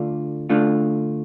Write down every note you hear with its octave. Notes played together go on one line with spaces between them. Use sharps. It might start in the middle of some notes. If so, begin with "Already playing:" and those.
Already playing: D3 A3 D4 F4
D3 A3 D4 F4